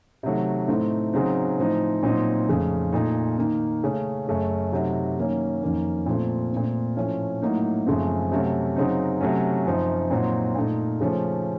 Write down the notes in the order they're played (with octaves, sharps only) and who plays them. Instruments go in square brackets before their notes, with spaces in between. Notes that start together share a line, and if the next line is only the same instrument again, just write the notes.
[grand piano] C3 D#3 F#3 A3
A2 A3 C4 D#4
C#3 F#3 C4 D#4
A2 F3 C4 D#4
A#2 F#3 C4 D#4
F2 C#3 A3
A#2 A3 D#4
D#3 A#3 D#4
C#3 A3 C#4
F#2 C#3 A3 C#4
C3 F#3 A3 D#4
D#3 F#3 A#3 C#4
F2 D#3 A#3 C#4
A#2 F3 A3 C4
A#2 A3 C4
A2 F3 A3 C#4
A2 F#3 A#3 D#4
F#2 C#3 F3 A3 C4
C3 F#3 A3 C#4
C#3 F#3 C4 D#4
C3 F#3 A3 C#4
F#2 F3 C4 D#4
A#2 F#3 C4 D#4
A#2 A3 D#4
C#3 F3 A3 C#4